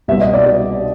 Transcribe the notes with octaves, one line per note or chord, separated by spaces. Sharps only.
C2 B2 G3 B3 E5
D#5
D5
G3 B3